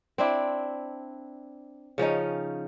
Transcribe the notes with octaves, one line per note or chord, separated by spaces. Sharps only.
C4 D4 E4
C#3 F3 C#4 D#4